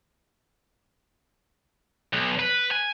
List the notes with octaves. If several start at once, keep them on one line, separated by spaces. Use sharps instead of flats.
B1
B4
G#5